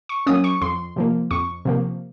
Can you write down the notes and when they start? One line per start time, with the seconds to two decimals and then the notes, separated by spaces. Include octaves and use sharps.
0.09 C#6
0.27 F#3 A#3 C#4 D#6
0.44 C#6
0.61 F2 C6
0.96 C3 F3 A#3
1.31 F2 C#6
1.65 C3 F3 A#3